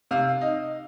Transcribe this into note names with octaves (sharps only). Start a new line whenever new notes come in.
C3 F5
D#4